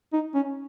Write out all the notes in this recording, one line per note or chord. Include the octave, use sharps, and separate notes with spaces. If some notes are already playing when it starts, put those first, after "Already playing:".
D#4
C#4